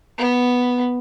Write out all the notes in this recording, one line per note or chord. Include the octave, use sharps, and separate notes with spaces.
B3